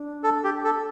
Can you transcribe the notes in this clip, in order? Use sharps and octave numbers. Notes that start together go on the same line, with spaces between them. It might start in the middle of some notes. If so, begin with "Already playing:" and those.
Already playing: D4
A4
G4
A4